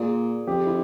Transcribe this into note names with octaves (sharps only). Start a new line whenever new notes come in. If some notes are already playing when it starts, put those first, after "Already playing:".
Already playing: A#2 G#4
F2 G4
E4